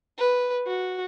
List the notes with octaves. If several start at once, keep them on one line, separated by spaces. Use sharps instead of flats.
B4
F#4